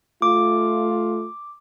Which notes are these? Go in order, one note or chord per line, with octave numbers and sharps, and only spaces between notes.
A3 F4 D6